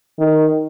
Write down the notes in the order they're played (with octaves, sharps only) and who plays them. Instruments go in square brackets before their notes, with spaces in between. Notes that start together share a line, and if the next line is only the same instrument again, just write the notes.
[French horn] D#3